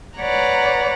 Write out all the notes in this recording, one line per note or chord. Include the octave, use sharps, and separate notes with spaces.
B4 C#5 D5 F#5 A#5